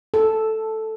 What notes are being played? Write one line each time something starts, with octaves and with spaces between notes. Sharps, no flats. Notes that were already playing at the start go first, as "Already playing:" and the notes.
A4